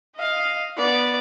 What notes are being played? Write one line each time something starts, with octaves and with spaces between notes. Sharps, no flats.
D#5 F5
B3 D5